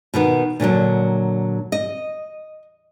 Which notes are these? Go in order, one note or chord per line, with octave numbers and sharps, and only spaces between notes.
B2 D#3 B3
A#2 D3 F3 F#3
D#5